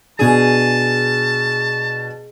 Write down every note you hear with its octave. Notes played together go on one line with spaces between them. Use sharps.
B2 D4 G#4 A5